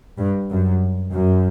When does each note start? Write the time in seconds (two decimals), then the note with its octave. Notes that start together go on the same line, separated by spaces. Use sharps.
0.18 G2
0.50 F#2
1.14 F#2